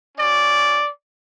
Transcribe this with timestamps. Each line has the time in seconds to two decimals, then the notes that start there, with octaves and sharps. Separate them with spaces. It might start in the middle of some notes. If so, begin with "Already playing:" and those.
0.17 C#4 F#4 D5